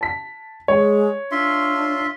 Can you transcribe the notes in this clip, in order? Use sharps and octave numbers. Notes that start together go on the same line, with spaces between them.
A5 B6
G#3 C#5
D4 F4 E5 C6